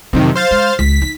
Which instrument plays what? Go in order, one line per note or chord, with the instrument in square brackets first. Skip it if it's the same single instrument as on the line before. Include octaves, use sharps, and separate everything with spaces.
[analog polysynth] F2 C3 D#3 [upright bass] F#3 D#4
[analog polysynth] C5 F5 A6
[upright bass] G#3
[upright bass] C#2 [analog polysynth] B6
[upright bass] D#4